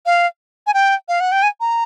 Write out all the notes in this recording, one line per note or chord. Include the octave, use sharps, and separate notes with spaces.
F5
G#5
G5
F5
F#5
G5
G#5
A#5